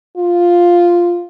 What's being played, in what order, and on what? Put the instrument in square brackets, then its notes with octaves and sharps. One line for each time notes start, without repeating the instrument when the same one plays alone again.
[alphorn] F4